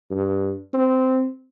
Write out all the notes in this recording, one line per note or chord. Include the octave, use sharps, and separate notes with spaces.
G2
C4